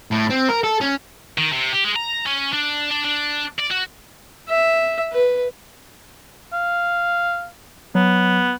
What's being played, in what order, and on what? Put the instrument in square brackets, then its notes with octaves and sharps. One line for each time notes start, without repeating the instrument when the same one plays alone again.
[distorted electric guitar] A2
C4
A#4
A4
C#4
D#3
C3
G4
G#3
A#5
C#4
D4
D4
D4
D5
F#4
[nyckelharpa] E5
B4
[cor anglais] F5
[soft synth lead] F#3 [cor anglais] B3